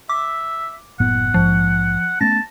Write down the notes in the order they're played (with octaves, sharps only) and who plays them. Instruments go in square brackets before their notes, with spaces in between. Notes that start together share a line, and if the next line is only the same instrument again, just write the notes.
[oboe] E5 [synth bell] D6
[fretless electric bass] F#1 A2 B3 [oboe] F#5
[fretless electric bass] A#1 G#2 [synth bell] F3
[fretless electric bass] A3 B3 C#4 [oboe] A5 [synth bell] A#6